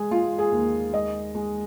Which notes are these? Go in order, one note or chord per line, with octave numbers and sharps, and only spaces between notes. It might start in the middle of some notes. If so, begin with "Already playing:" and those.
Already playing: G#3 G#4
G#3 F4
G#4
D#2
G#3 D#5
G#3